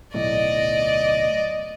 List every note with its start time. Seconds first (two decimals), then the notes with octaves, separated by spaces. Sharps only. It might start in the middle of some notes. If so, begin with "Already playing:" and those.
0.14 D1 B1 A2 D5 D#5